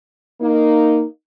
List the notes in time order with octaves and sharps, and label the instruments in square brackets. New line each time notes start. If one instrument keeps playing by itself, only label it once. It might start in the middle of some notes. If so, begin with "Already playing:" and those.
[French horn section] A#3 D#4